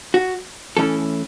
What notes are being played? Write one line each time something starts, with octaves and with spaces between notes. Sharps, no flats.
F#4
E3 A3 C#4 E4 A4